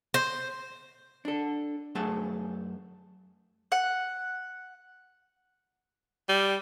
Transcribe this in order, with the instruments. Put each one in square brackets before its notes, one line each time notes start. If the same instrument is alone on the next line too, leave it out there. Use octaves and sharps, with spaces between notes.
[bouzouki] C5
[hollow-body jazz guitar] D4 A4
F#2 A3 G#4 A5
[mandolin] F#5
[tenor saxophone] G3